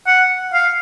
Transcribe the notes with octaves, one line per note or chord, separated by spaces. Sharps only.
F#5
F5